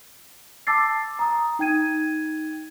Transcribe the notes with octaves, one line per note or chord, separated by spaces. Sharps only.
A5 D6 E6 A6 C7
A#5 D#6
D#4 G5 G#6 D#7